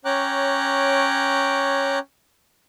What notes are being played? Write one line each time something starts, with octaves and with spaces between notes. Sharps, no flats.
C#4 C#5 G5 A#5 D6 F#6